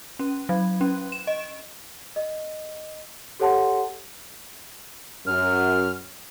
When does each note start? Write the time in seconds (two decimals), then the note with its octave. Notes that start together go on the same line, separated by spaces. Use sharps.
0.19 C#4
0.49 F#3
0.81 C#4
1.12 E7
1.27 D#5
2.16 D#5
3.40 G4 A4 C#5 F#5 A5 C6
5.27 F#2 F6